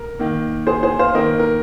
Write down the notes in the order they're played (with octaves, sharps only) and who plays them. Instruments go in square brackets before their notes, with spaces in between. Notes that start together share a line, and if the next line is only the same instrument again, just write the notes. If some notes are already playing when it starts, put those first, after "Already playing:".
Already playing: [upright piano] A#4
D#3 A#3
G#4 C5
G#4 C5
C5 F5
D#3 A#3 A#4 D#5
A#4